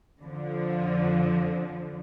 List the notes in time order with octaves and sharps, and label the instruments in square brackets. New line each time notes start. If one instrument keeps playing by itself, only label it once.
[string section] F2 D3 F3